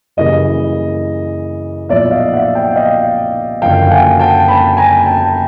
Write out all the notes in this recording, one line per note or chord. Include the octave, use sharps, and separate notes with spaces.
F#2 C#3 E3 G3 A#3 D#5
B1 A#2 F3 D5 E5
D#5 F5
E5 F#5
F5 G5
D#5 F5
F#1 F#2 D3 F3 F5 G5
F#5 G#5
G5 A5
A5 B5
G#5 A#5
G5 A5